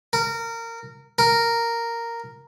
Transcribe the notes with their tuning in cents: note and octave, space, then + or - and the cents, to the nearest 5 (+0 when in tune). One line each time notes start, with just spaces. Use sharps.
A#4 -20
A#4 -5